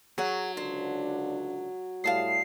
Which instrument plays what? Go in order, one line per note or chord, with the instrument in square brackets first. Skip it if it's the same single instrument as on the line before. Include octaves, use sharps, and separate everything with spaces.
[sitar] F#3 [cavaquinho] G#4 F#5
[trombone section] C#2 D3 D4 [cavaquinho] C5
[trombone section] A2 G3 [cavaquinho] F5 A5 D#6 [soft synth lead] C7